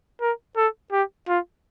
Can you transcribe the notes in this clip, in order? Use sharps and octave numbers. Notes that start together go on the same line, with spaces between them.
A#4
A4
G4
F4